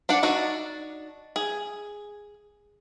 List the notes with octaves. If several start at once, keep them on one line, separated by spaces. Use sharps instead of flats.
D4 D5 F#5
D4 D#4 F#4
G#4